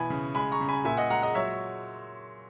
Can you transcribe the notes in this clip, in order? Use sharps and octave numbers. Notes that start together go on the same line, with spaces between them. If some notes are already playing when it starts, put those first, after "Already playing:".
Already playing: B2 E3 G#5 B5
C#3
G#3 G#5 B5
A#5 C#6
C#3
G#5 B5
A#2 E5 G#5
D#5 F#5
G#3 F#5 A#5
D#5 F#5
F#3 C#5 E5